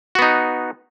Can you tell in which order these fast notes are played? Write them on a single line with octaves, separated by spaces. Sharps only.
F#4 B3 D#4